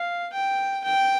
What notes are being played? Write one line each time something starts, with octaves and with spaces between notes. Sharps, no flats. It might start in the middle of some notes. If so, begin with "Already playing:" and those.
Already playing: F5
G5
G5